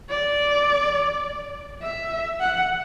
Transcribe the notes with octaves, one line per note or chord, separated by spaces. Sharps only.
D5
E5
F#5